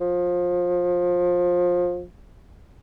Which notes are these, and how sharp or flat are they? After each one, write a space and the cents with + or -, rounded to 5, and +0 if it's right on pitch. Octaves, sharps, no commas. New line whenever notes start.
F3 +20